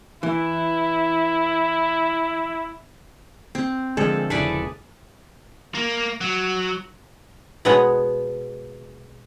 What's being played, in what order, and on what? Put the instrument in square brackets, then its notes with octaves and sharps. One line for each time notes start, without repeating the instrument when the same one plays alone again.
[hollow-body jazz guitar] E3 [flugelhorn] E4
[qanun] C4
[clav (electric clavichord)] D3 F3 [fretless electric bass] G#3 A#3 [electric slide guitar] G#4 [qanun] A4
[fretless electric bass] E1 C#3 D4 [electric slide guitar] E4 A4 [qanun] G#4 B4 D5
[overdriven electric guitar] A#3
F#3
[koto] B2 G#3 B3 C#5 D#5